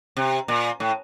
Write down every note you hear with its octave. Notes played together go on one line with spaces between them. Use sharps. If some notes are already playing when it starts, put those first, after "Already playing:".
C3
A#2
A2